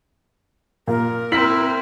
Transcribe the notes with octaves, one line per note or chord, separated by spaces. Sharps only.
A#2 A#4
C4 E4 B6 F#7